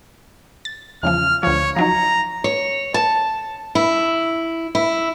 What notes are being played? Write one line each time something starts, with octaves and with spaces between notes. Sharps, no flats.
A6
E2 C#3 F3 F6
D2 F3 C#5
F3 F#3 D#4 A#5
C#5
A5
E4
E4